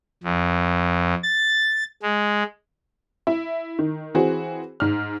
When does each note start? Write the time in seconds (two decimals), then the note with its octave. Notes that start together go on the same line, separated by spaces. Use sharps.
0.24 F2
1.23 A6
2.03 G#3
3.27 E4
3.79 D#3
4.15 E3 C4 F#4 G#4
4.80 G#2 F6